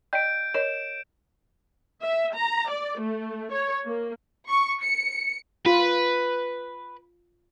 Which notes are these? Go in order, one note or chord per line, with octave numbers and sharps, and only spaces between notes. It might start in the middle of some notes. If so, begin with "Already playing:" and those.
D5 D#5 G5 G6 D7
A#4 C#5 D#5 E7
E5
A#5
D5
A3
C#5
A#3
C#6
C#7
F4 B4